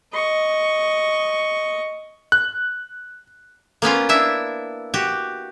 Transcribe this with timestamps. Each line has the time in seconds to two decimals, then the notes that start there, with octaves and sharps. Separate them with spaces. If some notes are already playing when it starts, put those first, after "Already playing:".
0.13 D#5 C#6
2.32 F#6
3.82 A#3 B3 C#4 F4
4.09 D4 E4 E5
4.94 F#4 G4